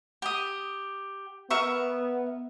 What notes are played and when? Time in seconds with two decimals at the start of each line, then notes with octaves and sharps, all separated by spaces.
0.22 G4 D#6
1.50 B3 A#4 E5 C#6